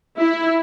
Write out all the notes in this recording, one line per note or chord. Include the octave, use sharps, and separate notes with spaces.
E4